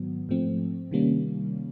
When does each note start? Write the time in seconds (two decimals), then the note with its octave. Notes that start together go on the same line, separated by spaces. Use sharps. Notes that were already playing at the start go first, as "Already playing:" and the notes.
Already playing: G#2 D#3 F#3 B3
0.29 G#2 F3 A3 C4
0.91 C3 D#3 G3 A#3 C#4